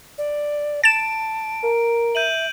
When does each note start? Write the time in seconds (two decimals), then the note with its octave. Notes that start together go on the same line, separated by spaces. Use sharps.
0.18 D5
0.84 A5 A6 D7 E7
1.63 A#4
2.15 E5 G6 D#7 F#7